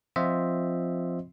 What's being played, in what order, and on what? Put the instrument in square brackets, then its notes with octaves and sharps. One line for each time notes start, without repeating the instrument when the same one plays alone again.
[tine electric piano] F3 C4 F4 C5 D#5 E5